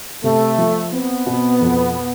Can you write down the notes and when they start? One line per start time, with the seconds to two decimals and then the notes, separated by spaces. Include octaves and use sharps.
0.23 C3 A3
0.58 F3
0.92 B3 C4
1.26 B2
1.61 F2